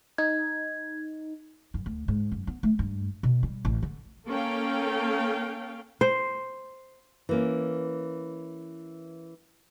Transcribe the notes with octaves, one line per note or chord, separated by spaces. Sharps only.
D#4 G#6
F#2
D2
G#2
F#2
B3
A3
G2
B2
G3
A1
D3
A#3 C#4 A4 F5 G5
C5
E3 A#3 C#4